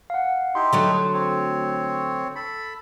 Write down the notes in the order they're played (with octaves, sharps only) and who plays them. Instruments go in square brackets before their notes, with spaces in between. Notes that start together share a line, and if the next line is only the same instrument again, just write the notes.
[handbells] F5 F#5
[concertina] D#4 E4 G4 [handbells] C6
[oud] D3 F#3 A3
[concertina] C4 C#5
A4 B5